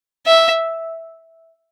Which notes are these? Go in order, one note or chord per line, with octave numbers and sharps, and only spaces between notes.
E5